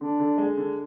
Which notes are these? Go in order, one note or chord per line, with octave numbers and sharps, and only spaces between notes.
D3 D4
D3
G#3
D3